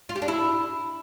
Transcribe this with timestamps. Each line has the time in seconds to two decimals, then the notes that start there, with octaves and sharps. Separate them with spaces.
0.09 F4
0.16 G4
0.22 D4
0.28 E4